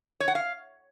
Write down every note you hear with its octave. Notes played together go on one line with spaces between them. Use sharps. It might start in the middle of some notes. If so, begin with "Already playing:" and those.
C#5
F#5
F5